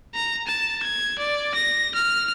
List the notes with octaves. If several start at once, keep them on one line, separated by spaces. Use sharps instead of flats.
A#5
A5
G#6
D5
A#6
F6